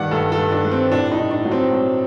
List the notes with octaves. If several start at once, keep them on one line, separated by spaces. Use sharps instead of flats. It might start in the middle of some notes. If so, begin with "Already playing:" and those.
Already playing: G2 D#3 G3 D5 F#5
G2 A4
A4
G2
D4
G3
C4
A2 D4
D#4
A2
D4
F#3
C4
F#3